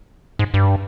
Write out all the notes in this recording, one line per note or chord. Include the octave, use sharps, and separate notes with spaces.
G#2
G2